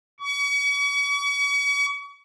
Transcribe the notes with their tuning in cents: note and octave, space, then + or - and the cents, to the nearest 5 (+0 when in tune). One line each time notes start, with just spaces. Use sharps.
C#6 +40